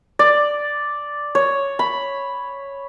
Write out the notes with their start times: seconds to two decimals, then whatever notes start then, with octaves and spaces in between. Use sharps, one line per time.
0.19 D5
1.35 C#5
1.79 B5